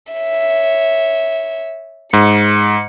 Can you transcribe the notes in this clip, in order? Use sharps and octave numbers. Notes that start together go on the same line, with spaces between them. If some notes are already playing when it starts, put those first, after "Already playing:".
C#5 E5
G#2 C#7